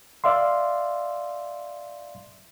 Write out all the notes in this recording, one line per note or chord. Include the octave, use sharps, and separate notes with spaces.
D5 E5 F5 C6